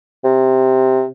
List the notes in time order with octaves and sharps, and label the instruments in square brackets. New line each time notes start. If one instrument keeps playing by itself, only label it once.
[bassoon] C3